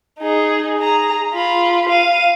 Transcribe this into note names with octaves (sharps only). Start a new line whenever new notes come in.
D#4 G#4
G#4 A#5
F4 B5
F5 D#7